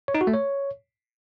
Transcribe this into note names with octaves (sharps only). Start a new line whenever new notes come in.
C#5
D#4
F#4
A3
C#5